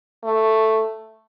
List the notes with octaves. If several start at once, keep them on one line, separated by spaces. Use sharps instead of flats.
A3